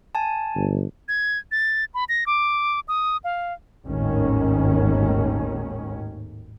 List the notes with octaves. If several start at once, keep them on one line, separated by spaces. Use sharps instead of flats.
G#5 A5
G1
G#6
A6
B5
A#6
D6
D#6
F5
G#1 D#2 A2 D#3 C#4